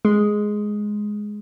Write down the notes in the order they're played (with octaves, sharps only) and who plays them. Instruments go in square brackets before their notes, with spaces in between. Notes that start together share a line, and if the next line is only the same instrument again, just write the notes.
[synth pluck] G#3